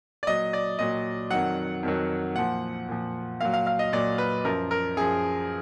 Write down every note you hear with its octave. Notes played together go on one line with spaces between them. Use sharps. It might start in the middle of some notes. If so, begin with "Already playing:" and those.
D5
A#2 F#3 D#5
D5
A#2 F#3 D#5
F2 D#3 F#3 F#5
F2 D#3 F#3
A#2 F3 F#5
A#2 F3
A#2 F#3 F5
F5
F5
D#5
A#2 F#3 D5
B4
F#2 F3 A#4
A#4
F#2 F3 G#4